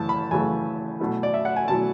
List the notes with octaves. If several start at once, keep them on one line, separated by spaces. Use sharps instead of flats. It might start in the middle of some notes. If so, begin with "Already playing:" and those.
Already playing: F#2 C#3 E3 A3 A5
B5
F#2 C#3 E3 A3 G#5
B2 F#3 A3 E4
D5
E5
F#5
G#5
B2 F#3 A3 E4 A5